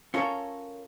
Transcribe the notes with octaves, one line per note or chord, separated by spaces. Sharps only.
C#4 F4 A4 A#4 C#5